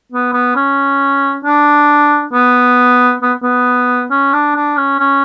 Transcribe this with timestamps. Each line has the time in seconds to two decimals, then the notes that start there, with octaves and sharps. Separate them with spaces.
0.12 B3
0.33 B3
0.56 C#4
1.45 D4
2.33 B3
3.22 B3
3.43 B3
4.11 C#4
4.33 D4
4.55 D4
4.77 C#4
4.99 C#4